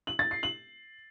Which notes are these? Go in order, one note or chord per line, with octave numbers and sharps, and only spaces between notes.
F#7
A6
C7
F#7